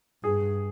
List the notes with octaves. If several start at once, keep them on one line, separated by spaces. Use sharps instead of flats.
G2 G#4